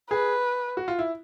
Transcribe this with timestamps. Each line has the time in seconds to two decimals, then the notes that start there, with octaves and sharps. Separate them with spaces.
0.10 G#4 B4
0.77 F#4
0.88 F4
0.99 E4